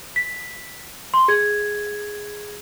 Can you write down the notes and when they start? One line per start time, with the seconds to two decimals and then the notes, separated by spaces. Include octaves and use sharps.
0.16 B6
1.14 C6
1.28 G#4 G#6